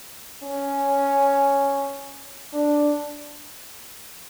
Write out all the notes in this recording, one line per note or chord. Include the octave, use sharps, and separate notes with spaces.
C#4
D4